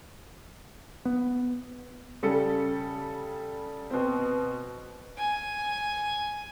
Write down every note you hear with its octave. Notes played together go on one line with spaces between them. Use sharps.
B3
C#3 G3 A4 C#7
B2 C4
G#5